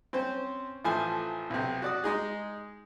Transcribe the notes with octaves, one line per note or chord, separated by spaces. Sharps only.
C4 C#4 C5
A1 F3 A3 G#5 A5
B1 C3
F#4 D5 D#6
G#3 D#4 G#4